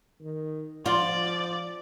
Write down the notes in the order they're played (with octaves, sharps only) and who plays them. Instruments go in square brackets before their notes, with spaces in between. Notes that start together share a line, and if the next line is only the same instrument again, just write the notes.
[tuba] D#3
[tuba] F3 [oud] F4 [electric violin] D5